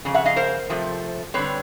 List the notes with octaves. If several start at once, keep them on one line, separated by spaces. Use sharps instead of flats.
F2 C#3
E5 F#5
D#5 F5
A#4 C5
C3 F3 A3
D3 G3 C4 B4 C#5